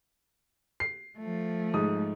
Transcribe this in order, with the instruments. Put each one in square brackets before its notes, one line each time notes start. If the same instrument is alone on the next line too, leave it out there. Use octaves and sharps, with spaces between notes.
[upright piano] C7
[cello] F3 A3
[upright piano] G#2 D#6